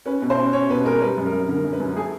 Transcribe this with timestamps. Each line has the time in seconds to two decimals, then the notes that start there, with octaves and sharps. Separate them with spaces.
0.05 C#4 B4
0.22 B2
0.30 C5
0.38 C#4
0.53 C#4 C#5
0.70 B2 B4
0.85 G#3 A#4
1.01 G3 B4
1.18 F#2
1.26 A#4
1.33 F#2
1.48 D3 A#4
1.65 F#2
1.73 B4
1.80 F#2
1.97 A3 G#4